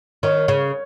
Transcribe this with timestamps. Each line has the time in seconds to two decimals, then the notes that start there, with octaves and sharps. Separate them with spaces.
0.23 D#3 C#5
0.48 C#3